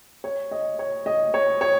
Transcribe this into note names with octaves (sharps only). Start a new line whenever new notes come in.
C#5
D#5
C#5
D#5
C#5
C#5